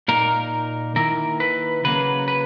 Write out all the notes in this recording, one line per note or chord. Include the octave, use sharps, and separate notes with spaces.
A#2 A#3 D#4 A#4
D#3 A#3 E4 A#4
B4
C#3 F#3 A#3 B4
B4